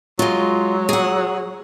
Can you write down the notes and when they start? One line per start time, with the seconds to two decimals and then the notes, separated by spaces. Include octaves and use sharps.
0.19 F#3 G#3 F4
0.89 G#4 F#5